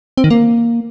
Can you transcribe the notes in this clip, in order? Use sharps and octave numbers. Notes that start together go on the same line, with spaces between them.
C4
D#3
A#3